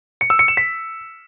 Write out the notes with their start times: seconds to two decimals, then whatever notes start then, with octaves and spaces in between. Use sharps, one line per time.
0.21 C#7
0.30 E6
0.39 C#7
0.48 E7
0.57 B6